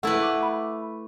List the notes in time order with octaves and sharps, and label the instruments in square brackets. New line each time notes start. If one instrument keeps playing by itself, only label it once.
[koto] A3 E4 B4 [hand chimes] F#5
[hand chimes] D6
B5